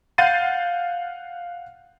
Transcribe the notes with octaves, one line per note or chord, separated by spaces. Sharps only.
F5 F#5 G6 A6 C7 D#7